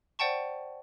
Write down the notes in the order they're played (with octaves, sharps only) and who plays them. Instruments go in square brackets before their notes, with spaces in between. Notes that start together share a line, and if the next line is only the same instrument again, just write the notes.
[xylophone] C5 D5 F#5 G5 A5 C#6